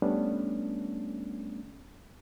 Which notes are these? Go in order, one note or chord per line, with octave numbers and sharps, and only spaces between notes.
G3 A3 B3 C#4 D4